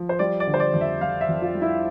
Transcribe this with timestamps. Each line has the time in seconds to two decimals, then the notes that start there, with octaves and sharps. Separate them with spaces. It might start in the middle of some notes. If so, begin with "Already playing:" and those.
Already playing: F3
0.09 C5
0.19 G3 D5
0.40 D5
0.47 D3
0.54 C5
0.60 D5
0.74 F2
0.81 E5
1.01 F2 F5
1.21 E5
1.29 F2
1.42 F4
1.55 G3
1.62 E4